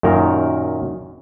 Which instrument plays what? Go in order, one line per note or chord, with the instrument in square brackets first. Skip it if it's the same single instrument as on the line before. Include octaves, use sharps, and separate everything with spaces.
[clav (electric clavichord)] F#2 A#2 D#3 A#4